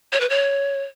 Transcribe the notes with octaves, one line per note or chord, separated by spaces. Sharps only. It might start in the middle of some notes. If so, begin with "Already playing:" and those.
C#5
B4
C#5